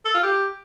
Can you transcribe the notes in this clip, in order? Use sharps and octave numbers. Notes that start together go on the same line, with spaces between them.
A4
F4
G4